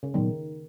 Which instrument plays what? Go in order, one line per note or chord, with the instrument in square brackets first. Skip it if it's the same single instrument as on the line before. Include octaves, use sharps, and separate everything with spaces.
[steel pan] C#3
[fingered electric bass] A#2 F#3 B3 [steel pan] D#3